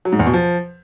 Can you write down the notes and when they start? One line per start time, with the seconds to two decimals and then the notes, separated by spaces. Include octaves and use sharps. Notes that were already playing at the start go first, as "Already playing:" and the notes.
0.05 F#3
0.12 G#2
0.19 E2
0.26 B2
0.34 F3